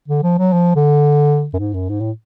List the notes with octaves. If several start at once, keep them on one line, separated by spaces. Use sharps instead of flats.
D3
F3
F#3
F3
D3
F#2
G#2
F#2
G#2
A2